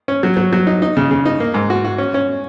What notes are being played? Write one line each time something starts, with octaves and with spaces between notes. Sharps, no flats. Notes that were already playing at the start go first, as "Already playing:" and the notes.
C#4
F#3
F#3
F#3
D#4
D#4
C#3
C#3
D#4
A#3
G#2
F#4
F#4
C#4
C#4